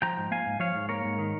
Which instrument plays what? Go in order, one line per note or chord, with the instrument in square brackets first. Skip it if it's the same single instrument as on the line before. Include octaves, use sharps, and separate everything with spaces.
[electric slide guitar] F3 G5 A#5
G#2
A#3 F5 G#5
G#2
F3 C#5 F5
G#2
A#3 A#4 C#5
G#2
D#3